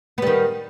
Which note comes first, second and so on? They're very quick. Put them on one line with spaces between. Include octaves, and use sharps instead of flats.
B3 G3 D#3